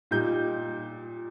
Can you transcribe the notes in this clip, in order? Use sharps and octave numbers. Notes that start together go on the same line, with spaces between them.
A#2 G3 D#4 G6